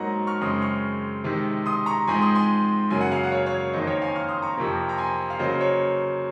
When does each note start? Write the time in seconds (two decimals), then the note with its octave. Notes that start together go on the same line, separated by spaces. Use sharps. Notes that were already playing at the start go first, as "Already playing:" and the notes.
Already playing: G#2 F#3 A#3 C5 C#5 D#5 F#5 A#5
0.27 C#6 F6
0.41 F#2 C#3 G#3 C4 C6 D#6
0.62 C#6 F6
1.24 C3 D#3 G#3
1.66 C6 D#6
1.86 A#5 C#6
2.08 G#2 F3 G#3 C4 G#5 C6
2.21 C6 D#6
2.35 G#5 C6
2.90 F#2 C#3 F#3 A#3 G#5
3.01 F#5
3.12 F5 G#5
3.23 F#5
3.32 C#5 F5
3.46 C#5 F5
3.73 F2 D#3 A#3 C5 D#5
3.87 C#5 F5
4.02 F5 G#5
4.16 C#6 F6
4.28 C6 D#6
4.42 A#5 C#6
4.57 F2 C3 F3 A#3
4.89 A#5
4.98 G#5 C6
5.30 F5
5.39 C#3 F#3 A#3 C5 D#5
5.61 C#5